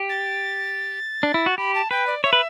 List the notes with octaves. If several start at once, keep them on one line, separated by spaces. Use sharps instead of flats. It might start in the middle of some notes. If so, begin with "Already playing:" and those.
Already playing: G4
A6
D4
E4
F#4
G4 B5
A5
B4 G5
D5
C#5 E5
B4